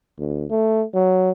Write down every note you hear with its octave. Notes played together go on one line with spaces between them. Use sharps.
D2
A3
F#3